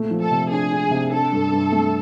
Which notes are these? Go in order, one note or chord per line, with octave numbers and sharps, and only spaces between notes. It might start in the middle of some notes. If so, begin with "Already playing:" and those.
Already playing: A#2 A3
F3
A4
C3
D4 G#4
D4
C3
D4 A4
G2
G2
A3